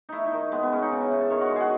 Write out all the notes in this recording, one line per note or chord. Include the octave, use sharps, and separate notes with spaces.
A3 D#4 E4
D#4
D#3
G#3 B3
B3
C#3 C#4
D#4
C#3
E4
C#3
A4
D#3 C#5
F#4
G#3
F#4 G#4